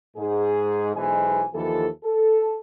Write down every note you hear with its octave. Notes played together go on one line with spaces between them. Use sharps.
G#2 G#4
B1 B2 E3 G#3 C5 G#5
D#2 E3 F3 A4
A4